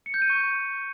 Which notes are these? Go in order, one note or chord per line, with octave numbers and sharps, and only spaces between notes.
C#7
G6
D#7
C#6